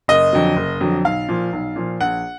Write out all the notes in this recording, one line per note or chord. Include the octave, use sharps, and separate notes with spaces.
F#1 D#5
F2 D3 F#3
F#1
F2 D3 F#3
B1 F5
A#2 F3
B1
A#2 F3
A#1 F#5